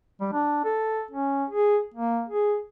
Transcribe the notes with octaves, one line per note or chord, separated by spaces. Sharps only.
G3
D4
A4
C#4
G#4
A#3
G#4